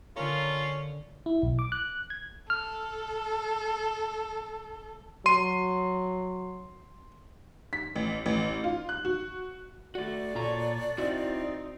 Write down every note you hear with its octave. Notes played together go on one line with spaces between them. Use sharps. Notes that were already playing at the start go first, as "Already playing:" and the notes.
D3 C#4 F4 A#4
E4
B1
D6
F#6
G#6
A4 F6
F#3 C6 D#7
B6
A1
A1
F4
F#6
F#4
A3 F#4 D5
A#2 F4 A4 C#5 A#5
C4 D#4 E4 F#4 E5